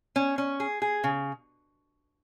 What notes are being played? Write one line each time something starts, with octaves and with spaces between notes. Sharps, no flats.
C#4
C#4
G#4
G#4
C#3